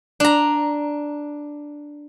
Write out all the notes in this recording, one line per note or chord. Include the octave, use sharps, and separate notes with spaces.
D4 A#5